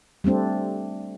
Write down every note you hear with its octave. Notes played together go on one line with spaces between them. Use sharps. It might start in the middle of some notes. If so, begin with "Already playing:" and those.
G3 A3 C4 D4